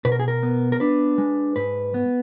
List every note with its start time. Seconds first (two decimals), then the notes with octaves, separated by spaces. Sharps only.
0.05 B2 B4
0.12 A#4
0.19 G#4
0.28 A#4
0.43 B3
0.72 A#4
0.80 D4 B4
1.18 G#3
1.56 G#2 B4
1.94 B3